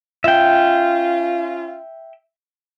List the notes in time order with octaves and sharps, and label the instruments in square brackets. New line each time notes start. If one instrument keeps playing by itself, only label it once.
[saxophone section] C#4 F4 [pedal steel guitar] E5 G5